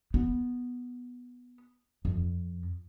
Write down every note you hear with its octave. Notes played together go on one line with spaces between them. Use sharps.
B3
F2